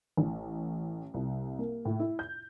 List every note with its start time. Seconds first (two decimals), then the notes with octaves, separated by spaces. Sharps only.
0.17 A1
1.14 C2
1.59 A#3
1.85 A2
2.00 E4
2.19 G6